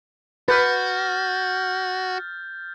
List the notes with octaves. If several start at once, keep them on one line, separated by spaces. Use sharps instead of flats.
F#4 B4 F6 G6 A6